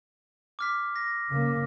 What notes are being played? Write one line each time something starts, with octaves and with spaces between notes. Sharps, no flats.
D6 F6 B6
A#6
C#3 A#3